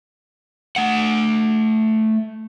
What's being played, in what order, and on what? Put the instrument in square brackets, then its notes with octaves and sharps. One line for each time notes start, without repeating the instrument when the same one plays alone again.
[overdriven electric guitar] A3 F#5